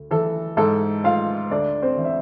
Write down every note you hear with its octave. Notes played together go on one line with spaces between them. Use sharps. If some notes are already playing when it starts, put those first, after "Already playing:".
Already playing: D2
E3 A4
G#2 A4
A3 F4 F5
D2 D4 D5
C4 C5
E3
E5